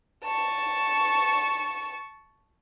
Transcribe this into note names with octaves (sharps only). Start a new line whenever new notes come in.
A5 C#6